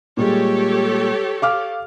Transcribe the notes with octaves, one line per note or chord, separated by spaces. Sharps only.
A#2 G3 G#3 G4 A4 C#5
F5 D6 F6